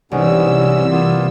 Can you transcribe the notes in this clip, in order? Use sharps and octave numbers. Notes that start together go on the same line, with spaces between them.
C2 G#2 C3 E3 B3 C#4 E6
A#3 B3 F4